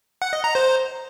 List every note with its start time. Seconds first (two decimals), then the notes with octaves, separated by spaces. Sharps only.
0.22 F#5
0.33 D#5
0.44 A#5
0.55 C5